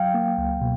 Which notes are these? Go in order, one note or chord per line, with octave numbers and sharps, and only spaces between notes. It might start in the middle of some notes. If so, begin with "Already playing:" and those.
Already playing: F#3 F5 G5
A#3
C#2
B2